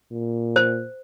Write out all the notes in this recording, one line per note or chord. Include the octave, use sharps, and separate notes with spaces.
A#2
C5